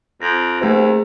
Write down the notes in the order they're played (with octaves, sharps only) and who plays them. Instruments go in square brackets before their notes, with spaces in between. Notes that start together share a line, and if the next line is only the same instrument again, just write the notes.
[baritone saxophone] F2 [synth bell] A#6
[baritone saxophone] D#2 [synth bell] A3 G#4 C5